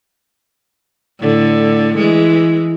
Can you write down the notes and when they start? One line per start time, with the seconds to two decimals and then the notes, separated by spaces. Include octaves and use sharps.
1.19 A2 D3
1.97 E3 G#3